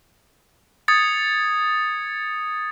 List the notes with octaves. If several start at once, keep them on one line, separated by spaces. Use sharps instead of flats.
D#6 G#6 A6 C#7